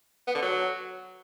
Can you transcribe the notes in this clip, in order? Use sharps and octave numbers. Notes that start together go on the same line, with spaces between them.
B3
D3
F#3